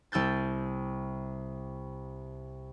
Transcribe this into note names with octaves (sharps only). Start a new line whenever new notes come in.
C2 E6 G6 A6